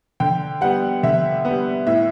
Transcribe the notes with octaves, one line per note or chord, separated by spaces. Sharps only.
D3 G5
G3 B3 F#5
D3 E5
G3 B3
A2 E5